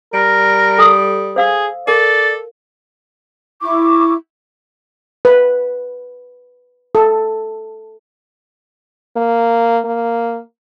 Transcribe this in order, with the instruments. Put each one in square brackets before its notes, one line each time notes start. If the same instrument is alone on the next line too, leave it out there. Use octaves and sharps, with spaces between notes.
[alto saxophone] G3 [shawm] A#4
[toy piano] A4 A5 D#6
[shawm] G#4 [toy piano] C5 F5 E6
[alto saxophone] A4 [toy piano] A#4 [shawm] D5
[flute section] E4 C#6 D6
[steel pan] B4
A4
[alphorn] A#3
A#3